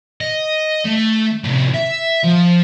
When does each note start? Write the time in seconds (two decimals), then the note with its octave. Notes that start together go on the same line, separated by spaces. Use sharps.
0.21 D#5
0.85 A3
1.44 A2 C3
1.74 E5
2.23 F3